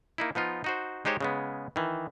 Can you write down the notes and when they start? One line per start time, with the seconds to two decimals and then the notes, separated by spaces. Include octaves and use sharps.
0.18 A#3 D#4 E4
0.35 F3 B3 D#4 F4
0.64 D#4 F#4 C5
1.05 G#3 D#4 G4 C5 C#5
1.20 C#3 G#3 B3
1.76 D#3 E3